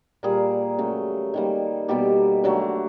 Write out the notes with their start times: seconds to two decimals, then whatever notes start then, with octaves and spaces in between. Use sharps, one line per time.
0.23 A#2 G3 A#3 G#4 A#4
0.78 C#3 F#3 A3
1.34 D#3 G3 A#3
1.88 B2 G3 A#3 G4 A4
2.44 D3 F#3 A3